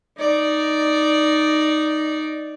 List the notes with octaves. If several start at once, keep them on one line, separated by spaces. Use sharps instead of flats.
D#4 D5